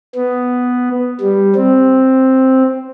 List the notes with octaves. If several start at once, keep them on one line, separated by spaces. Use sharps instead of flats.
B3
G3
C4